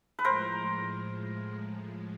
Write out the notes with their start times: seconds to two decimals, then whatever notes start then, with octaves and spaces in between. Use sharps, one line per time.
0.19 B4
0.25 A2 F3 G#3 A#4 C5